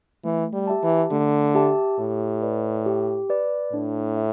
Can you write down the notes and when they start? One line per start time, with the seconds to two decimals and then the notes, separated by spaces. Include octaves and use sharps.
0.24 E3 A3
0.53 G3
0.67 G4 E5 A5
0.83 E3
1.11 D3 A3
1.55 G4 E5 A5
1.99 A2 G4
2.42 B4 D5
2.86 G4
3.30 B4 D5
3.73 A2 D4
4.16 E5